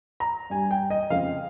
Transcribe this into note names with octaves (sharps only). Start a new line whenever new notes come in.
A#5
G2 G3 G#5
G5
D#5
F2 C#3 F3 G#3 F5